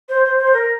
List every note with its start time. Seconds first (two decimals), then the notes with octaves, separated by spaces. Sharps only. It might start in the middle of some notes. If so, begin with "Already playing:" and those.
0.09 C5
0.24 C5
0.38 C5
0.53 A#4